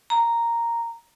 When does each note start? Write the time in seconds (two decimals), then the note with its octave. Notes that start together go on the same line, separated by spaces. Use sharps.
0.10 A#5